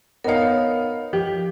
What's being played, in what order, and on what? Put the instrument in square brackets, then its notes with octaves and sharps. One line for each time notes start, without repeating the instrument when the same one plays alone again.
[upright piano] B3 D#4 F5 [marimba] A#4 C#5
[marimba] F3 [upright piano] G4